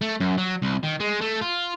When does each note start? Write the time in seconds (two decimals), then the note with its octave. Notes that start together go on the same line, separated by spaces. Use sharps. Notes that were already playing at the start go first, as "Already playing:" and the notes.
0.01 A3
0.20 F#2
0.38 F#3
0.62 C2
0.84 D#3
1.00 G#3
1.21 A3
1.41 F4